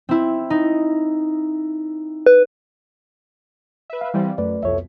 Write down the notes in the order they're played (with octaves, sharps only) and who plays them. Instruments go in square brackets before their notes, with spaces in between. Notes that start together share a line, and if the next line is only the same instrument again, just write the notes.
[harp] C4 E4
D#4
[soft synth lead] B4
[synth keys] B4 E5
[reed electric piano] F5
[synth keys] E3 G3 C4
[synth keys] F#2 [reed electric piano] A3 B4 D5
[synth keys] C2 F2 B2 [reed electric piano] A4 C#5 E5